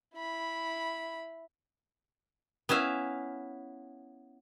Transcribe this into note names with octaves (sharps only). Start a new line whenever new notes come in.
E4 B5
B3 C#4 E4 E5 F5